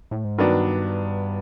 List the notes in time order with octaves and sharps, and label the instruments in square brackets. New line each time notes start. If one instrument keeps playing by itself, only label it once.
[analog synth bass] A2
G#2
[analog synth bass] G2 [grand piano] D#3 F#3 B3 D4